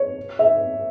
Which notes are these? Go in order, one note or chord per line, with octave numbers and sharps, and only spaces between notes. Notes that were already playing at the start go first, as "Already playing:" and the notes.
Already playing: C#5
E5